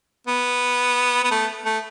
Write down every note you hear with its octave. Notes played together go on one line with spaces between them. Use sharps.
B3
B3
A3
A3